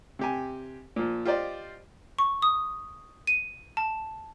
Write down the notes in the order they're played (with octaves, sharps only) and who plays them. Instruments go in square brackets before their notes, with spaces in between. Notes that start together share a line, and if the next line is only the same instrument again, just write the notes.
[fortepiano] C3 G4 G#5
A#2 F3
F4 G4 C5 D5 D#5
[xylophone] C#6
D#6
D#7
A5